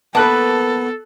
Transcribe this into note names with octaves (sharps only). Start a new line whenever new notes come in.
A#3 B3 A4 B4 A5 F#6